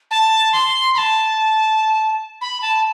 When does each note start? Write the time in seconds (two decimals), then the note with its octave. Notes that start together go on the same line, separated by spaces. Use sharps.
0.11 A5
0.53 C6
0.95 B5
0.98 A5
2.41 B5
2.62 A5